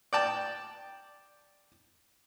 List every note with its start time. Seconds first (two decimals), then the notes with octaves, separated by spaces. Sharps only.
0.13 D5 G5 A5